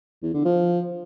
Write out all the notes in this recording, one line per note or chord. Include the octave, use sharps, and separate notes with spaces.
E2
D3
F3